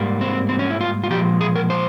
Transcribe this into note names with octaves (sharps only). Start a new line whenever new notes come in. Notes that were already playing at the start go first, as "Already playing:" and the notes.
Already playing: G#2 G3 A#3
C4
C4
C#4
E4
F4
F4
A#2 F3 G#3 G4
G#4
A#4
C5